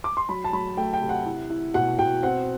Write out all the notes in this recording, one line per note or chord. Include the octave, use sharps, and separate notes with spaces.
D6
C6
F#3 B5
A5
F#3 B5
A3 G5
G5
C3
F#5
E4
E4
B2 F#5
B2 G5
C4 F#5